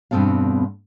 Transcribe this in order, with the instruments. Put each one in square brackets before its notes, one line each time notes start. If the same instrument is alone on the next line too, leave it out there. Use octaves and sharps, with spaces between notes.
[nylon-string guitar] E2 G2 B2 C4 A4 F5